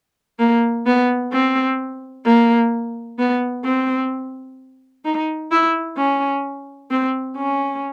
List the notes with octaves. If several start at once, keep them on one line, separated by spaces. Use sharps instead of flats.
A#3
B3
C4
A#3
B3
C4
D#4
E4
C#4
C4
C#4